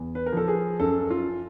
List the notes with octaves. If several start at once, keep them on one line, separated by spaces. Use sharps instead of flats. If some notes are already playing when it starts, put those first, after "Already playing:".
Already playing: E2
B4
A#4
F3 A4
G#4
F#2 A4
F4